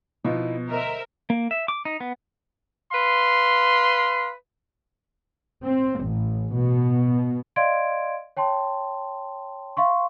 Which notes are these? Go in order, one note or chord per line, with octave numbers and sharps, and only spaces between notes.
B2 F3 B3 D#4 E4
D2 A#4 C5 D#5 E5
A#3
E5
D6
D#4
B3
B4 F5 C6
C4
A1
B2
D5 D#5 F5 C6 G#6 D7
C#5 G5 A5 C6
E5 F5 C6 C#6